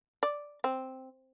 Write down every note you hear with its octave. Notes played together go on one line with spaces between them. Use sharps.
D5
C4